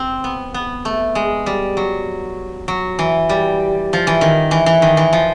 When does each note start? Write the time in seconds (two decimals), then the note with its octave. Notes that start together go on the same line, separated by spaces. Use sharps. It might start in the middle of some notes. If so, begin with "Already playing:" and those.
Already playing: C4
0.24 B3
0.54 B3
0.85 A3
1.15 G#3
1.46 G3
1.77 F#3
2.68 F#3
2.99 E3
3.29 G3
3.93 F3
4.07 E3
4.21 D#3
4.51 E3
4.66 E3
4.82 D#3
4.97 E3
5.13 F3